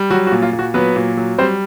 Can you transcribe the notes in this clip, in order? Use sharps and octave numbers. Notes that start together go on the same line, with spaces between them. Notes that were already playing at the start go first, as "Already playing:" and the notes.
Already playing: G3
F#3 F#4
F#4
A#2
F4
A#2
F#4
F#3 B3 B4
A#2
F#3
G3 C4 C5